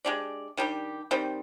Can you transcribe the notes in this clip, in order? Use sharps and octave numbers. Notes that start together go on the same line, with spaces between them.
G#3 D4 G4 D5
D#3 G3 D4 G4
D#3 G3 C4